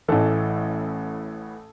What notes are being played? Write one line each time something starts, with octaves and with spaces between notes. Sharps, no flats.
A1 A2 E3 A4